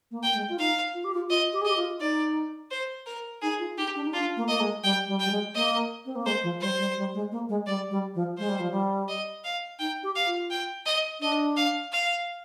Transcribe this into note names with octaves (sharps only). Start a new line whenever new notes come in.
A#3
G5
A#3
G#3
F4
D#4 F5
F4
G4
F4
F4 D#5
G4
G#4
G4 D#5
F4
D#4 D5
C5
A#4
D#4 G#4
F4
D#4 G4
D4
D#4
D4 F4
A#3
A#3 D#5
G#3
G3 G5
G3
G5
G3
G#3
A#3 D#5
C4
A#3
G#3 C5
F3
G3 C5
G3
G3
G#3
A#3
G#3
G3 D5
G3
F3
G#3 C5
G3
F3
G3
D#5
F5
D#4 G5
G4
F5
F4
G5
D#5
D4 D#5
F5
F5